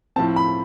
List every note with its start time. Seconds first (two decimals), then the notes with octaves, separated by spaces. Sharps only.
0.16 A2 F3 C4 A5
0.36 B5